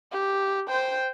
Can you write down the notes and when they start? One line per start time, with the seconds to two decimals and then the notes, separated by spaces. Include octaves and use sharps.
0.12 G4
0.68 C5 G5